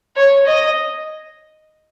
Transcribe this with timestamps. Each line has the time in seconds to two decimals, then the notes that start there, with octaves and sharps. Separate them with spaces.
0.16 C#5
0.46 D#5